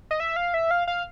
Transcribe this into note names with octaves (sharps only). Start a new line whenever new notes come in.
D#5
E5
F5
E5
F5
F5